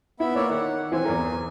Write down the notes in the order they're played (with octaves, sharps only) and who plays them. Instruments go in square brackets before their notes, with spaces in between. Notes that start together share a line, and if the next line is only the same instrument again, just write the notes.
[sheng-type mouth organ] B3 E5 B5 [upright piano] E4
[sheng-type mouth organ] A#3 C#5 D5 [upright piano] E6
[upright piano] D#3 [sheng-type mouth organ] F#5
[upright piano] E3 C4 [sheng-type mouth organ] G#5
[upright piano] E2 A#4